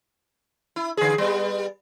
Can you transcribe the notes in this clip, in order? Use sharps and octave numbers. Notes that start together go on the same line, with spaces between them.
E4
D3 G#4
G3 B3